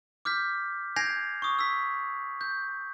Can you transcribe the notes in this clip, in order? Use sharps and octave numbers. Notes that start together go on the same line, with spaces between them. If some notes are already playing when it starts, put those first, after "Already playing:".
D6 F6 G6 B6
G#5 G6 G#6 A#6 C7 F7
C#6 D#6
E6 B6
G6